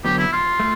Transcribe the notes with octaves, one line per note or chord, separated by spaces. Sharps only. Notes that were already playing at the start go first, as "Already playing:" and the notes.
D3 F#3 B3 G4
E4
F4
A3